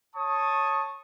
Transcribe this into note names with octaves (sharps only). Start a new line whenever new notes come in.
C#5 A5 C#6 D#6